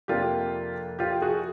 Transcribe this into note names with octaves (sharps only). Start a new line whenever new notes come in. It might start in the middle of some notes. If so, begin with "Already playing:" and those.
F2 C3 F3 A#3 D4 F4 G4
F4 G4
F#4 G#4